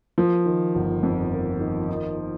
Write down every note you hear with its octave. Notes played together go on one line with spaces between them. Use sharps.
F3 A#3
D#3
G1
F2
A#3
D#3
D#4
A#3